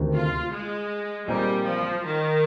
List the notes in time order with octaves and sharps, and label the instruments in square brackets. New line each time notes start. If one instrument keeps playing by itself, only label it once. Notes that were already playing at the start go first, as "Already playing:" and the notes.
Already playing: [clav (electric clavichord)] D2 C3 D#3
[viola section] F4
G#3
[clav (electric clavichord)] A#2 G#3 C4 D#4 A#4 [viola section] G3
[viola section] F3
D#3